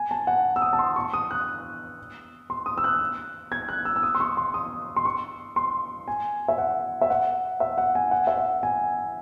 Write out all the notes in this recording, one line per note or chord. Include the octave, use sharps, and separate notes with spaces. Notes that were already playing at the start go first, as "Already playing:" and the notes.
Already playing: G#5
A5
F#5
E6
D#6
A5
C6
C#6
D#6
F#6
C6
D#6
E6
F#6
G#6
F#6
E6
E6
D#6
C6
C#6
C6
D#6
C6
C#6
C6
G#5
E5
F#5
E5
F#5
E5
F#5
G#5
F#5
E5
F#5
G#5